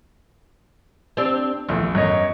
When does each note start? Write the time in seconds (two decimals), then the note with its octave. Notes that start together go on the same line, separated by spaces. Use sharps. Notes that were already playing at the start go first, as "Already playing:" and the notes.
1.17 C4 D4 G4
1.68 A#1 E2 A3
1.95 F#2 C#5 D#5